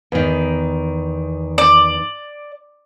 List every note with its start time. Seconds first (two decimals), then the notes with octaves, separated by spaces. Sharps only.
0.12 E2 D#3
1.58 D5